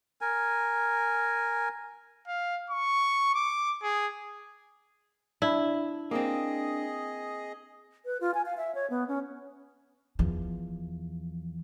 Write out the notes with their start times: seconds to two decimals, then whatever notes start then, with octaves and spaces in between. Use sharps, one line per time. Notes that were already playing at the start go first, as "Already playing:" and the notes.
0.21 A#4 G#5
2.27 F5
2.70 C#6
3.35 D6
3.82 G#4
5.42 D4 E4
6.11 A#3 C4 G#4 D#5
8.05 B4
8.21 F4
8.34 G#5
8.46 F5
8.57 E5
8.75 C#5
8.90 B3
9.08 C#4
10.19 E2 F3